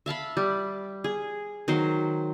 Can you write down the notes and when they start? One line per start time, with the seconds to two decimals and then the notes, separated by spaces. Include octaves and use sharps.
0.06 E5 F5 A5 B5
0.37 G3
1.04 G#4
1.68 D#3 F#3 C5 C6